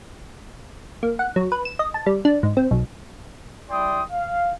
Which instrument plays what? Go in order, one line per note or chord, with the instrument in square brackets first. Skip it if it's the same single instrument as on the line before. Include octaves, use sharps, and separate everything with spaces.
[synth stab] A#3
F#5
F#3
B4
E7
D#5
A5
G3
D4
G#2
C4
B1
[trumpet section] G3 E4 D5 G5 C6 D#6
F5